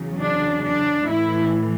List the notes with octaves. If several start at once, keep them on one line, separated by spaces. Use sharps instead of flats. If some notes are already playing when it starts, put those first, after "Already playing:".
Already playing: E2 C#3 F#3
D4
D4
A2 E3 E4